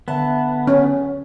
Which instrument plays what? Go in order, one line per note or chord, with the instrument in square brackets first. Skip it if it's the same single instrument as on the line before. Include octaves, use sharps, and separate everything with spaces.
[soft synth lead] D3 [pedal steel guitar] B3 [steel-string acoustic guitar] E5 F#5 A5
[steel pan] C#4